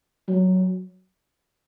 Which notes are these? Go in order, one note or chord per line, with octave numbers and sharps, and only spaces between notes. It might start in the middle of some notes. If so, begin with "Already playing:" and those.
F#3